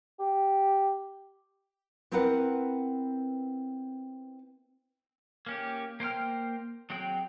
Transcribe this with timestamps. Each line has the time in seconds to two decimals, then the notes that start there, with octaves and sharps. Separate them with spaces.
0.19 G4
2.12 B3 C4 E4 A#4 B4 F#5
5.46 A#3 C#4 G4
6.00 A#3 C5 G5 F6
6.90 F#3 C4 G#4 G5